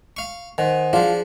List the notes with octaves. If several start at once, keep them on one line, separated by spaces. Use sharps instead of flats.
F5 C#6
D#3 C5 F#5 G#5
F3 D4 F4 G#4